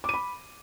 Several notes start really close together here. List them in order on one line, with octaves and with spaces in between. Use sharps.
D6 D#7 B5